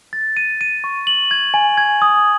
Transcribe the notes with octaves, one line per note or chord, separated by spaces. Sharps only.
A6
D#7
D#7
C#6
F#7
G#6
G#5
G#6
D#6